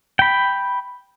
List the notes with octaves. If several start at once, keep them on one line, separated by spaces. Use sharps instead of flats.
G5 B5